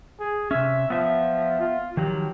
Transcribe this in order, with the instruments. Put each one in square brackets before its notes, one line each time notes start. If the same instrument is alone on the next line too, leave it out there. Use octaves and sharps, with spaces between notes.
[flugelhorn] G#4
[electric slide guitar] C3 C#4 [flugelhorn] E5
[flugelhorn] F3 [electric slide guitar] B3 E5
[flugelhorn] F4
[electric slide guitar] D#3 F3 F#3 [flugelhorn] G4